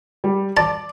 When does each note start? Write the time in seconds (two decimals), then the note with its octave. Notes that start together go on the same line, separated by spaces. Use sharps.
0.24 G3
0.57 D5 A5 D6